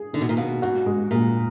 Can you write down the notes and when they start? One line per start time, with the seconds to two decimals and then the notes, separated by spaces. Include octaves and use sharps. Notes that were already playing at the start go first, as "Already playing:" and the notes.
Already playing: G#4
0.13 D3 D#3
0.21 B2
0.29 A#2
0.37 B2 A#3
0.62 G#2 F#4
0.86 G#3
1.11 A#2 G#3